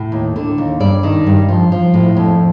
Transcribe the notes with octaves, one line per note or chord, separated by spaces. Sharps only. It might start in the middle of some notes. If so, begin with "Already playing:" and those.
Already playing: A2
D#2
D3
D#2
G2 D5
D#3
G2
F3
F3
A2
F2